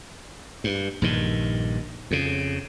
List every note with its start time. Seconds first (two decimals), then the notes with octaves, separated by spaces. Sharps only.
0.64 G2
1.02 A#1 G2 D#3
2.11 F2 C#3